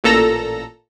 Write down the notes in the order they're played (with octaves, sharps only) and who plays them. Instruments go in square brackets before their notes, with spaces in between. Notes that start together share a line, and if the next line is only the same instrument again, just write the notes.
[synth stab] A1 A#2 A4 A#5 E6 A#6